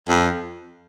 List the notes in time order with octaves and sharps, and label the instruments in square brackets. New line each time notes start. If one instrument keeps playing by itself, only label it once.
[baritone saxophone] F2